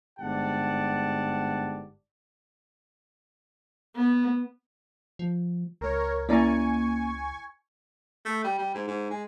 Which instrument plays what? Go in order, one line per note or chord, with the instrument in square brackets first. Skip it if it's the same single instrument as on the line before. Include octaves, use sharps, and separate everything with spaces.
[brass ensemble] G1 G#2 G4 D5 F#5 A5
[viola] B3
[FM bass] F3
[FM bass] C#2 [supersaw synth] A#4 C#5
[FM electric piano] A#3 C#4 [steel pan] E4 D5 A#5 [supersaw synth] G#5 C#6
[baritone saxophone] A3
G3
G3
G#2
G#2
G#3